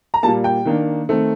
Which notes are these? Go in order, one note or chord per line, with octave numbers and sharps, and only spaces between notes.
A#5
A#2 G3 A#3 A5
G5
D#3 A#3 D4
D#3 A3 C4